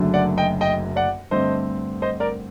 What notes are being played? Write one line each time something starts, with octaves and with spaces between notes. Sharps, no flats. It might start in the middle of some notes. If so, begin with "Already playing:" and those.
Already playing: F#1 F#2 D3 A3
D5 F#5
D#5 G5
D#5 G5
D5 F#5
G2 D3 A3 C4 C5 D#5
C5 D#5
A#4 D5